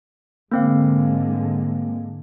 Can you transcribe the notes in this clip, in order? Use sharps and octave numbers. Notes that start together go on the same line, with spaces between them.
G#2 D3 G#3 A#3 C4 F5